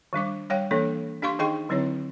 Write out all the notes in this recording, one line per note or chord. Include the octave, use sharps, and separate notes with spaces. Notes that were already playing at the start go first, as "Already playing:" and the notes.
D#3 G3 D4 D6
G3 C#5 F5 G5
E3 A#3 D4 A4 C#5
D4 G4 F5 C6 C#6
D#3 D#4 G#4 D#5 G5 C6
D3 F#3 C4 E4 C#5